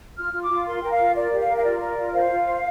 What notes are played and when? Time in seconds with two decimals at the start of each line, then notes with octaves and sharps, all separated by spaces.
0.18 F4 F6
0.33 F4
0.42 D6
0.50 F4
0.66 A#4 C6
0.82 A#4 G5
0.92 F5
0.99 F4
1.16 A#4 D5
1.33 G4
1.41 F5
1.48 A#4
1.57 F5
1.64 F4 D5
1.81 A#4
1.97 F4
2.13 C5 F5
2.30 F4
2.46 C5